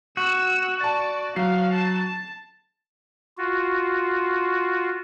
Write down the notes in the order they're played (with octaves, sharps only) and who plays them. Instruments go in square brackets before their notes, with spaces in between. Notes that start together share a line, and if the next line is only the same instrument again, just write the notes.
[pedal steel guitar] F#4 [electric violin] E6
[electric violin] D5 [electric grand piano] A5 A6
[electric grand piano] F#3 C7 [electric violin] F5
[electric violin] A5
[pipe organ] F4 F#4